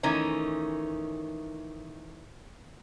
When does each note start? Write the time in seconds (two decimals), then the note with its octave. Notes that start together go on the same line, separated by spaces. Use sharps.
0.03 D#3 E3 A3 C#4 D#4